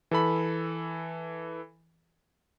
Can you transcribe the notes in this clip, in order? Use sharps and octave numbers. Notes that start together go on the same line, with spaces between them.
E3 A4 B5